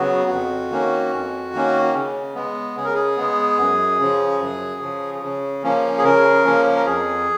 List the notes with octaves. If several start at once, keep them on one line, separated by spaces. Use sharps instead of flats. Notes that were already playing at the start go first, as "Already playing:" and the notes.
Already playing: C#3 F#3 B3 F#4
F2
D#3 A#3 C#4
F2
D#3 A#3 C#4
C#3
G#3 B3
C#3 G#4
A#4
G#4
G#3 B3
F#2
C#3 F3
F#2
C#3 F3
C#3
F3 A#3 C#4
G#4
C#3 A#4
F3 A#3 C#4
A#4
F2 G#4